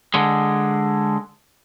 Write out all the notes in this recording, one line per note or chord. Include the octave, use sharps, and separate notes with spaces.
D3 G#3